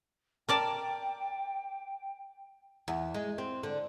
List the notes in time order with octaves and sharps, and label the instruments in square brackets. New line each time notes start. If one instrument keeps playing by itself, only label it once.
[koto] A#4 D5 A5 [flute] G5
[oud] E2
G#3
C4
D3